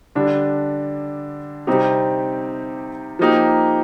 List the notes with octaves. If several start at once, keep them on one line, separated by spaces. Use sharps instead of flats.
D3 G3 D4
C3 G3 C4 D#4 G4
F3 A#3 D#4 G4